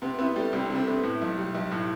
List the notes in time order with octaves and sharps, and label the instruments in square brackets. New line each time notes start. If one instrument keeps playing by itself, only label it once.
[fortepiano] C3 [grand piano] B3
[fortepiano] B3 [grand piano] C4 E4
[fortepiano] G3 [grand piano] A3
[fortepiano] C2 [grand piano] C4
[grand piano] D4
[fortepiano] C3
[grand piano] A3 C4
[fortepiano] B3
A2
B1
G3
B1
A2